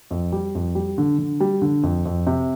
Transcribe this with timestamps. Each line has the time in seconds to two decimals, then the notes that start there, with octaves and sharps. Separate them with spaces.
0.11 F2
0.32 G3
0.55 F2
0.75 G3
0.98 D3
1.19 D3
1.40 G3
1.62 D3
1.83 F2
2.05 F2
2.27 C3